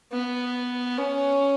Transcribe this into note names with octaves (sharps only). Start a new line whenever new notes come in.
B3
C#4